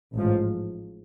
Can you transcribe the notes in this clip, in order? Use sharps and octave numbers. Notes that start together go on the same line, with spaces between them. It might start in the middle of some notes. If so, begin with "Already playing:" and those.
A1 G#2 F3